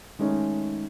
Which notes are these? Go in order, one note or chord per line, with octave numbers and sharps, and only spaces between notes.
D#3 G#3 A3 C#4 D#4